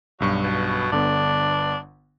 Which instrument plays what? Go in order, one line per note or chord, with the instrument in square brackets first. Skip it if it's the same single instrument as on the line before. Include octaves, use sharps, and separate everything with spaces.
[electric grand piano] B1 G2 C#6 [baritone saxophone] F#3
[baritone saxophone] B2
[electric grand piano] G1 D3 B3 [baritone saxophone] D4